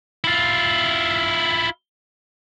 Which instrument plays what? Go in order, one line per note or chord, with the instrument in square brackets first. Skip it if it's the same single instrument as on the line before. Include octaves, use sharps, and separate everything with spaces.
[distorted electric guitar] E4 F4